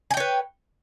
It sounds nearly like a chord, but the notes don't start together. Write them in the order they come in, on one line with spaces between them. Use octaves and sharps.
G#5 G5 C#5 B4